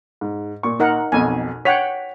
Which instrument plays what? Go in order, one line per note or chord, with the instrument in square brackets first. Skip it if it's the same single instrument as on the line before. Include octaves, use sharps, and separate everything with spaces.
[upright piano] G#2
A#2 C#6
[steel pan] D#4 A#4 F#5
[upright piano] B1 F2 B2 [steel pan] G#5
[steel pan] C#5 F#5 G5 [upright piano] B6 F7